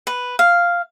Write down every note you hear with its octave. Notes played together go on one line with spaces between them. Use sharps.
B4
F5